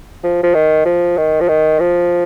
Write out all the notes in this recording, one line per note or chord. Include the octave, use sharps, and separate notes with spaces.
F3
F3
D#3
F3
D#3
F3
D#3
F3